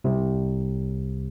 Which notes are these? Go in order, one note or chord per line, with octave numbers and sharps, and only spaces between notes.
C2 C3